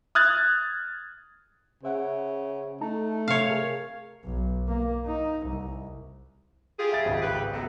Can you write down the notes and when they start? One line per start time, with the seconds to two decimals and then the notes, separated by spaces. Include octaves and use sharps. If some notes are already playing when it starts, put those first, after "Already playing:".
0.15 D#6 F6 F#6 G#6 A6
1.83 C#3 C5 E5 F#5
2.81 A3 D#4 A5 A#5
3.28 C3 C#5 E5 F5
3.50 G#4 A#4
4.25 B1
4.68 A#3
5.07 D#4
5.48 C2
6.78 F4 G4 G#4
6.92 E5 A6 D7
7.05 G#1 C#2
7.21 G4 B4
7.53 F#3 A3 B3